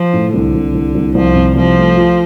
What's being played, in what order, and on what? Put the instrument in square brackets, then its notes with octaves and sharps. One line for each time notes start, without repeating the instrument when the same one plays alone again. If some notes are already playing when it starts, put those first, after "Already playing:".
Already playing: [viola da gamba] F3
[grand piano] A2
[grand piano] C2 [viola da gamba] D3
[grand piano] C2
C2
C2
[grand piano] C2 [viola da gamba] F3
[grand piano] C3
[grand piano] C2 [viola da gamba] F3
[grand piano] A3
F4